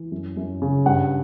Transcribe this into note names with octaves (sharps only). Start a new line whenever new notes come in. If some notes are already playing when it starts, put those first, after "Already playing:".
Already playing: E3
F#2
F#2
C#3
G2 F#5